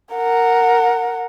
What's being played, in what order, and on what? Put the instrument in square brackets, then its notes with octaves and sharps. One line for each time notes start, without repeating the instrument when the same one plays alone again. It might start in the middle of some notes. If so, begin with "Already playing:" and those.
[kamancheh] A#4 F#5